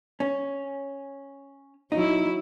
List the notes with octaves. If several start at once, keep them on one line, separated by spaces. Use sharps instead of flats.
C#4
F#3 D#4 E4